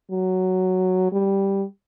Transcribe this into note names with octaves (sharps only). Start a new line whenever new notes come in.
F#3
G3